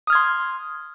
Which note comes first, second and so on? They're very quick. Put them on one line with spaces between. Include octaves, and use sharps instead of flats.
D#6 F6 G#6 C6